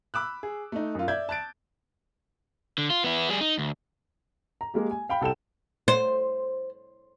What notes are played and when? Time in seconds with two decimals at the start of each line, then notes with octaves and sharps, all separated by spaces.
0.14 B5 D6 E6 F#6
0.43 G#4
0.72 A3 D#4
0.95 F#2 F4
1.08 D5 E5 G6 G#6
1.29 A5 F#6 A6 D7
2.78 D3
2.90 F4
3.04 B3 E4
3.29 G3 G#4
3.41 D#4
3.58 D2
4.61 A#5
4.74 G#3 A#3 G4
4.91 G#5
5.09 F5 G5 B5
5.21 C2 A4 G5 E7
5.88 C5